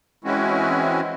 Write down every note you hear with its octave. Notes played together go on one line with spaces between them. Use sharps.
E3 G#3 C4 C#4 E4 F#4